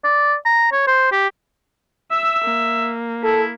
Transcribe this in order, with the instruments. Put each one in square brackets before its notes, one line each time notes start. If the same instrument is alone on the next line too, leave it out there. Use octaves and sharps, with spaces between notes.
[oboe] D5
A#5
C#5
C5
G4
[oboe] E5 [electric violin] E6
[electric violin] A#3
[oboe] E4 [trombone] A4